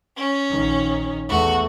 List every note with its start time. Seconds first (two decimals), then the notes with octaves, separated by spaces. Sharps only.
0.17 C#4
0.51 A#1 D#3
1.29 E2 A3 F#4